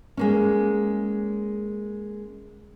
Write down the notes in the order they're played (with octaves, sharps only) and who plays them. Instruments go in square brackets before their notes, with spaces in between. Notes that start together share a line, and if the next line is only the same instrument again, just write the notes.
[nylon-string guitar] G#3 A#3 C#4